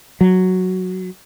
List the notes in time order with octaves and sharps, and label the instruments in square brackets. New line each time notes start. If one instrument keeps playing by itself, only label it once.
[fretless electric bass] F#3